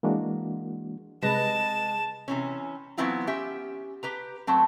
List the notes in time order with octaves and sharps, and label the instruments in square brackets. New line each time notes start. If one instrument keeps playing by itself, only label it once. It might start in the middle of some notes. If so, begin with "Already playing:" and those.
[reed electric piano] E3 G#3 A#3 D4 F#4
[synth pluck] C3 B4 A#6 [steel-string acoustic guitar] G#3 [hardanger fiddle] A5 [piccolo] E7
[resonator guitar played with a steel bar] C3 E3 C#4
E3 F#3 B3 C4 E4 F4
C#4 G4 E5
G4 B4 A#5
F#3 A3 C4